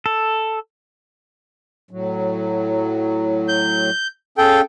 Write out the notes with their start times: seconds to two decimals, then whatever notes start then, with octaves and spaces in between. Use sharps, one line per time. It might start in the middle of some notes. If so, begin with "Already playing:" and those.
0.06 A4
1.91 A2 F#3
3.48 G6
4.38 C#4 G#4 A4 F5 G5